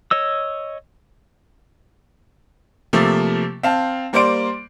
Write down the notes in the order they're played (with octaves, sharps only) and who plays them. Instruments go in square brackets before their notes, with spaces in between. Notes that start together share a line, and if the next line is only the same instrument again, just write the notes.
[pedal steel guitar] C#5 D#5 E6
[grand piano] C3 F3 A3 A#3
C4 F5 A5
G3 A#3 C5 D5 C6 D7